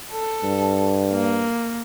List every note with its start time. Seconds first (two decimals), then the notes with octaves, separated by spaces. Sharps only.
0.12 A4
0.44 G2
1.11 A#3